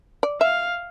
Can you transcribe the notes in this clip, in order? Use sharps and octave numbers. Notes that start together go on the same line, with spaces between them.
D5
E5 F5